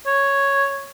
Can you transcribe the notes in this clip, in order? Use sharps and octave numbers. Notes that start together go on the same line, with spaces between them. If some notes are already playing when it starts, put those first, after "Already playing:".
C#5